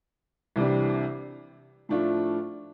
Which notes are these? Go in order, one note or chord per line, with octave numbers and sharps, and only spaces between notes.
C2 C3 E3 G3 D4
A2 F3 A3 D4 F4